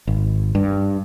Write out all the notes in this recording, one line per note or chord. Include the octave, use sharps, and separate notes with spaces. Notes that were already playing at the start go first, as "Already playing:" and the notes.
G#1
G2